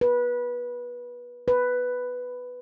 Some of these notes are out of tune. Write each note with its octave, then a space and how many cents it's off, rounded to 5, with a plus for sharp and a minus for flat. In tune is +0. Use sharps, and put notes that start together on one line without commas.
B4 -20
B4 +5